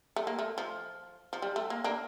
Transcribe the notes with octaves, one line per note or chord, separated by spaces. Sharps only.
A3
A#3
A3
F3
F3
G3
A3
A#3
A#3 D4